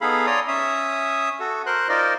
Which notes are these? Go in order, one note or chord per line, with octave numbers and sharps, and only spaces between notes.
B3 D#4 G#4 A4 F5 B5
C#5 D5 A#5 C6 D#6
C#4 E5 D#6
F#4 A4
A#4 C5 C6 F#6
D#4 F4 A#4 C5 D5 D#5